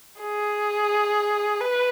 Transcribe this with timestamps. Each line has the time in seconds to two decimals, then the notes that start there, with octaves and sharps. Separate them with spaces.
0.20 G#4
1.61 B4